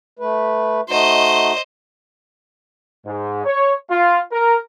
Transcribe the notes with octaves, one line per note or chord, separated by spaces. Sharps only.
A3 B4
A3 D#4 F#4 C5 D#5
G#2
C#5
F4
A#4